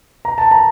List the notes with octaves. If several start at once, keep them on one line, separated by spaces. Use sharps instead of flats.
A#5
A5
A#5